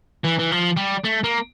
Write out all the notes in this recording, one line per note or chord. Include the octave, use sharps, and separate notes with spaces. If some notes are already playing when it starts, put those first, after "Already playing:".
E3
E3
F3
G3
A3
A#3